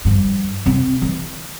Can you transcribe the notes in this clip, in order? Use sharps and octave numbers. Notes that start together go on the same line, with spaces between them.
G2 F3
C3 C4
E3